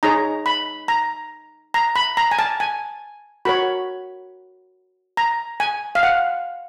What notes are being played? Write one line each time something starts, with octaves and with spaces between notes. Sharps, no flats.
D#4 G#4 C#5 A#5
B5
A#5
A#5
B5
A#5
G#5
A5
G#5
F#4 A#4 C#5 B5
A#5
G#5
F5
F#5